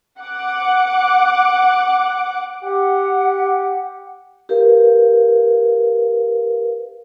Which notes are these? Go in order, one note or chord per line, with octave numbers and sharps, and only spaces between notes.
F#5 D6
G4 F#5
G4 A#4 B4 F5